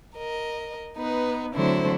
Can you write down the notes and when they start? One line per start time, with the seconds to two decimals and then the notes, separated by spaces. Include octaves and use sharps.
0.17 A#4 D#5
0.97 B3 D#4 B4
1.54 D3 F#3 A3 C4 E4 C5